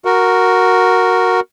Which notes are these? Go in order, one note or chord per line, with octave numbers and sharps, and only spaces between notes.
F#4 A#4